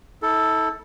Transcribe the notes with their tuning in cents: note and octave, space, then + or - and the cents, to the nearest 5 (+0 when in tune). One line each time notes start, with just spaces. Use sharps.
E4 -40 A4 +0